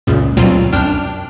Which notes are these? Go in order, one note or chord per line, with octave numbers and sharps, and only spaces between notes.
C#2 F#2 A#2 C#3
D2 B2 F#3 G3 C4 F4
C2 F#2 D4 G5 F6 E7